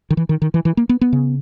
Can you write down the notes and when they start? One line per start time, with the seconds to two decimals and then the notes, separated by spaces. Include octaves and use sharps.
0.10 D#3
0.17 E3
0.29 D#3
0.42 D#3
0.54 E3
0.65 E3
0.77 A#3
0.89 B3
1.01 B3
1.13 C#3